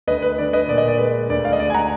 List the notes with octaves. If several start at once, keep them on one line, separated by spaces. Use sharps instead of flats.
D2 B4 D#5
B4
D3 D5
B4 D#5
A#2 D5
D#5
D5
G#3 B4
D2 D5
D5 F5
D#5
D2 D5
G#5
F#5 A#5